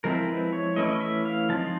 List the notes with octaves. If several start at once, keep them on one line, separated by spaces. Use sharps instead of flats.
F3 G#3 C4 E4 A#4
B4
C#5
E3 A3 C#4 E4 D#5
E5
F5
F3 G#3 C4 D#4 A5